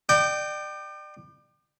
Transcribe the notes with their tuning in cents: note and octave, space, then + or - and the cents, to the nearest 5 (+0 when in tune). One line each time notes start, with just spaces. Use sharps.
D5 +35 G5 -15